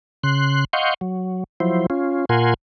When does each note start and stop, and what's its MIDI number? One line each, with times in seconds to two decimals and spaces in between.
0.23 0.65 49
0.23 0.65 84
0.23 0.65 90
0.73 0.94 75
0.73 0.94 77
0.73 0.94 78
0.73 0.94 84
0.73 0.94 85
0.73 0.94 91
1.01 1.44 54
1.60 1.86 53
1.60 1.86 54
1.60 1.86 64
1.60 1.86 72
1.90 2.25 61
1.90 2.25 65
2.29 2.54 46
2.29 2.54 65
2.29 2.54 70
2.29 2.54 78
2.29 2.54 80
2.29 2.54 84